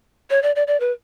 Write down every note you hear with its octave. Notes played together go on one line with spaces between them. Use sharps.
C#5
D5
D5
D5
B4